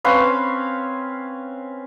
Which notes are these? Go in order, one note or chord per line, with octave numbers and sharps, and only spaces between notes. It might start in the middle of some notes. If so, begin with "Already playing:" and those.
C4 C#4 B4 F5